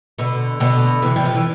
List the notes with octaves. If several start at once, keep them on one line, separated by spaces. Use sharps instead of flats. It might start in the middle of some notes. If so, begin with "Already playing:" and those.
B2 D3
B2 D3
C3 E3
G3
F3
E3